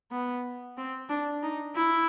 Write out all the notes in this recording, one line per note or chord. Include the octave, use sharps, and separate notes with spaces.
B3
C4
D4
D#4
E4